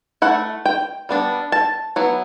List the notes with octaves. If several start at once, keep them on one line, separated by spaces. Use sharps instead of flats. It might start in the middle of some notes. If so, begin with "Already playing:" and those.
A3 E4 F#5
G5
G3 B3 D4
A5
F#3 B3 E4